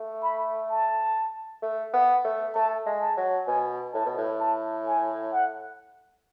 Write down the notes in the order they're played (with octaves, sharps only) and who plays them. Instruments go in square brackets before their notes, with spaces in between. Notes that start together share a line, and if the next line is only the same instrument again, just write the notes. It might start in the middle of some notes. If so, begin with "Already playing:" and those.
Already playing: [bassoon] A3
[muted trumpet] B5
A5
[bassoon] A3
B3
A3
[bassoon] A3 [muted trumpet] A5
[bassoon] G#3
[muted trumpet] A5
[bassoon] F#3
[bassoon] B2 [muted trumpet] G#5
[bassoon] A2 [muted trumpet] A5
[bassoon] B2
A2
[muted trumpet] A5
G#5
F#5